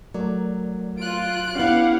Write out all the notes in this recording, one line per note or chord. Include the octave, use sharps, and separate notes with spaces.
F#3 A3 A#4 D5
F4 F#6 D7
B3 C#4 D4 E4 G4 F5 F#5